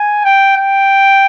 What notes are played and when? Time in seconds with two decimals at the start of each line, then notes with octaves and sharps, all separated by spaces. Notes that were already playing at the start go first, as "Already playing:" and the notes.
Already playing: G#5
0.25 G5
0.57 G5